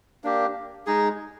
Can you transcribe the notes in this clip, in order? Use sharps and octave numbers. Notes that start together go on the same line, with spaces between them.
A#3 D4 G4
G#3 D#4 G#4